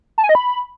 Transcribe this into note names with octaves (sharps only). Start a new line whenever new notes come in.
A5
G#5
D#5
B5